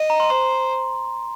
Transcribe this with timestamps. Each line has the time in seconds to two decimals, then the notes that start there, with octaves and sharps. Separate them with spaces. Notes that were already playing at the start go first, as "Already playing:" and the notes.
Already playing: D#5
0.10 A#5
0.20 C6
0.30 C5 C6